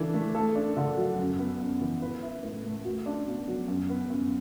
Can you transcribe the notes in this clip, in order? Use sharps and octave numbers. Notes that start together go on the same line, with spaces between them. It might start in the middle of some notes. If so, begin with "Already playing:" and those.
Already playing: E3 D4 A4
A3
A4
D4
D3
F#3
F#2
B3
F#2
E3
B4
E4
A2
A3
F#4
D4
B2
F#3
F#2
B3
F#2